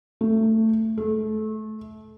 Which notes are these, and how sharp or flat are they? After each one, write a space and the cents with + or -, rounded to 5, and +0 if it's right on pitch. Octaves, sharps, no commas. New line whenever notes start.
A3 +15
A3 -25